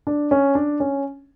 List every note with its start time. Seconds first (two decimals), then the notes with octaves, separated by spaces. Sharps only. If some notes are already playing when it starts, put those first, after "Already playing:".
0.07 D4
0.31 C#4
0.55 D4
0.80 C#4